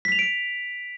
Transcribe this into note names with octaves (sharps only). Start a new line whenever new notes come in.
B6
F7
D7